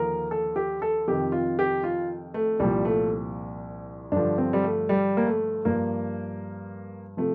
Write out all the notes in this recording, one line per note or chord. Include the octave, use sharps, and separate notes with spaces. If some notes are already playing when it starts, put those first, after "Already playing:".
Already playing: D#2 D3 F3 A#4
A4
G4
A4
F2 C3 D#3 G4
F4
G4
F4
A3
C2 A#2 F3 G3
A3
G2 D3 F3 D4
C4
G3
A3
G3
A#3
A3
G2 F3 A#3
C3 F3 A3